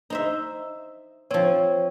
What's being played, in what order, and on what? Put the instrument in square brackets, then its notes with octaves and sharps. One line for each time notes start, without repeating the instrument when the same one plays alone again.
[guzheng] D#4 C5 E5
[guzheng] F3 C4 [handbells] C#5